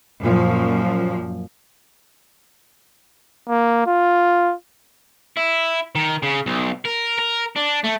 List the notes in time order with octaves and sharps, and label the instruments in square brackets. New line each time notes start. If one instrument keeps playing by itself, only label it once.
[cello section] F#2 A#2 F3
[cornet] A#3
F4
[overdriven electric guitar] E4
D#3
C#3
B1
A#4
A#4
D4
A3